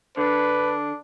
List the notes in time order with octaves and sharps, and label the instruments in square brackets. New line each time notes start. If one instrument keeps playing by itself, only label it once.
[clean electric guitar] D3 [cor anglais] D4 [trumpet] B4